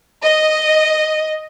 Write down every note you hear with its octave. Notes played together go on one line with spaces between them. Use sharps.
D#5